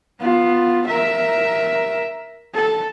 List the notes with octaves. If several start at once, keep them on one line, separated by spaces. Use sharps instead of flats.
B3 F4
A#4 E5
A4